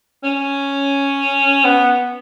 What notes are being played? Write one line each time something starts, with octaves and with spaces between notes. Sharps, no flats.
C#4
B3